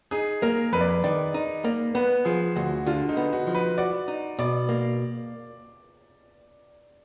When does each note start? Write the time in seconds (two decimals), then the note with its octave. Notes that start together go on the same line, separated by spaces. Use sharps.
0.11 D#4 G#4
0.42 A#3 A#4
0.73 F2 B4
0.81 D5
0.89 B4
1.04 D#3 D5
1.34 D#4
1.64 A#3 D5
1.95 B3 B4
2.25 F3 G#4
2.56 D2 F#4
2.87 D3 F4
3.09 D#4
3.17 B3
3.33 F#4
3.47 F3
3.55 B4
3.78 F#4 D5
4.08 D#4
4.39 B2 D5
4.69 A#3